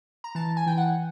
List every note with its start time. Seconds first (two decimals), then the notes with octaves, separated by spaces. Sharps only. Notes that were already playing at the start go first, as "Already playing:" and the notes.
0.24 A#5
0.35 E3 A5
0.57 G#5
0.66 E3 G5
0.78 F#5